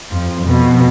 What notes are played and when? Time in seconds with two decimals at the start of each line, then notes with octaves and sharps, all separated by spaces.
0.10 F2 F3
0.42 F2 B2